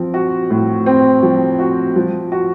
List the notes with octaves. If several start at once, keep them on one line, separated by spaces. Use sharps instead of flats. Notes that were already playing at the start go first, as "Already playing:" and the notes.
Already playing: F3 C4
F#4
A2
C4
F3
F#4
F3
F#4